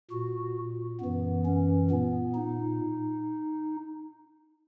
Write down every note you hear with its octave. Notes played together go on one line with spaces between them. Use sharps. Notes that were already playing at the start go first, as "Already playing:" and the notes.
A#2 F#4
F#2 E3 B3
C#4
A#2 B3
D#4